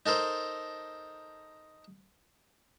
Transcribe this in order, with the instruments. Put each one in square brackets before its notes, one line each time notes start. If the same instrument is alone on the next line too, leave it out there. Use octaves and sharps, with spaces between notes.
[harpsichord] D#4 A4 A#4 C5